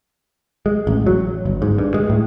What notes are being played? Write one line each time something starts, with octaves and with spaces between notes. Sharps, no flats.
G#3
A1
F#3
G1
G#2
G2
G#3
A2